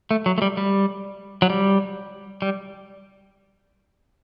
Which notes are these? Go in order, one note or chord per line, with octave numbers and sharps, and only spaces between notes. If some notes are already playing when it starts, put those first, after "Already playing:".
A3
F#3
A3
G3
G3
F#3
G3
G3